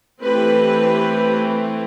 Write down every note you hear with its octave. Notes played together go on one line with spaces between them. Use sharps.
E3 A3 C4 G4 B4